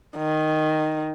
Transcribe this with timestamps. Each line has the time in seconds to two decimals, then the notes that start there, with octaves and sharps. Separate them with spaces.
0.17 D#3